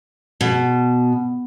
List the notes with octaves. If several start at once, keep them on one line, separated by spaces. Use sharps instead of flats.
B2